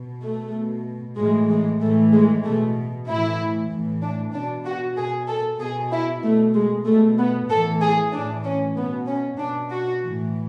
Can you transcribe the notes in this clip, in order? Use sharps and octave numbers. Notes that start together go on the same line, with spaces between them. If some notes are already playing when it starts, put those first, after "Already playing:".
Already playing: B2
A3
B2
A2 E3 G#3
G#3
A2 E3 A3
G#3
B2 A3
A2 E3 E4
A2 E3
D4
B2 D4
F#4
B2 G#4
A4
B2 G#4
E4
B2 A3
G#3
B2 A3
B3
A2 E3 A4
G#4
A2 E3 D4
C#4
B2 B3
C#4
B2 D4
F#4
A2 E3